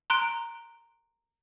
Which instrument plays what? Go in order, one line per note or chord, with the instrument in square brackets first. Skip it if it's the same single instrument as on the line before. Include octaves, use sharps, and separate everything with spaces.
[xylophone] A#5 C6 F#6 D7